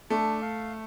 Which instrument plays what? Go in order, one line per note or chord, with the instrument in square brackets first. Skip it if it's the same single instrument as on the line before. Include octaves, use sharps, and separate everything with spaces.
[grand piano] A3 [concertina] D4
[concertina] F5